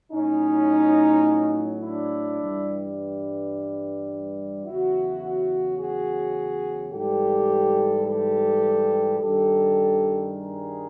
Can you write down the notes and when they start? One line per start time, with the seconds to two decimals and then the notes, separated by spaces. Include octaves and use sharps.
0.12 A2 F#3 C#4 D#4
1.82 D4 E4
2.40 G2 E3 G3
4.66 E2 C#3 F#3 E4 F#4
5.79 F#4 G#4
6.92 G#2 E3 G3 G4 A4
8.06 G4 A4
9.19 G2 D#3 G3 G4 A4
10.32 G#4 A#4